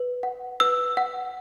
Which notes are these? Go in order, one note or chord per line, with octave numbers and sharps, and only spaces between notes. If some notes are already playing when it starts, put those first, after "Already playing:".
Already playing: B4
F#5
B4 E6
F#5